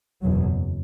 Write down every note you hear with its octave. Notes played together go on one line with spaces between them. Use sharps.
F#1 E2 B2 F#3